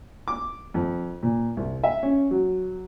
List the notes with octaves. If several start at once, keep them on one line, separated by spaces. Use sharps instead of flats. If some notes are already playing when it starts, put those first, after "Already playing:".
D6
F2
A#2
C2
E5
C#4
F#3